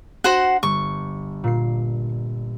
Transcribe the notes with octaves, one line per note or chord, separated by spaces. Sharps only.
D4 F#4 C5 F#5
G1 C#6 D6
A#2 C7